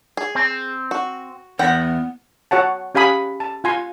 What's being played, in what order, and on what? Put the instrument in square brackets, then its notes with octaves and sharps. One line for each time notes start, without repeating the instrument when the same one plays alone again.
[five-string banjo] G#4
[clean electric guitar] C4
[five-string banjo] F#4
[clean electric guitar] E2 [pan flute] B3 [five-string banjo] F#5 G5
[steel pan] F#4 C#5 F#5 A5
C#4 G4 F5 G#5 B5 D#6
A5
F4 G#5 C6